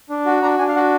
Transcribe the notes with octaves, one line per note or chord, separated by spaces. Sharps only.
D4
F#4
D4 A#5
D4 G#5
F5
F#4 F#5